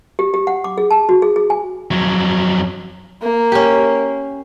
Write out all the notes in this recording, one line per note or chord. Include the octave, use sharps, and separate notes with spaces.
G4
G4
F#5
D6
G#4
A5
F#4
G#4
G#4
G#5
F2 F#3
A#3
C#4 G4